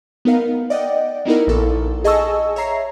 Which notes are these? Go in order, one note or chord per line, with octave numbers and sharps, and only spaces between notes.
B3 D#4 A#4 F5
D5 D#5 F#5 G5
A#3 B3 D#4 E4 A#4
A#1 A4
G#4 D#5 G#5 A5 C#6 E6
C#5 E5 A#5 C7